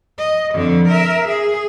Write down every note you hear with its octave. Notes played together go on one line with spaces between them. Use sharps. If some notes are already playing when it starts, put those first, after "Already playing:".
D#5
F2 D3
A#4 E5
G#4